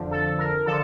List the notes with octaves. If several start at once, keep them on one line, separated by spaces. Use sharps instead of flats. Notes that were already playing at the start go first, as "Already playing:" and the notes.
Already playing: F2 D3 F3
A4
A#4
D3 F3 A4